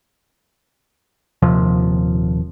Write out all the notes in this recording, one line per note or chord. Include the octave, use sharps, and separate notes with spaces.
D#1 D#2 C3 F3